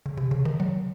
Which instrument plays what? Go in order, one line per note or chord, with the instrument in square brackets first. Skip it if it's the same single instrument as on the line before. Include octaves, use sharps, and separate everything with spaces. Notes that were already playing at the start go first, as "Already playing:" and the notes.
[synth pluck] C#3
C3
C#3
D#3
F#3